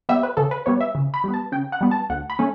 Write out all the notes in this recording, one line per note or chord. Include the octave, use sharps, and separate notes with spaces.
G3 B3 E5
B4
C#3 A4
B4
G3 B3 C#5
E5
C#3
B5
G3 B3
A5
C#3 G5
F#5
G3 B3
A5
D2 F#5
B5
A3 C#4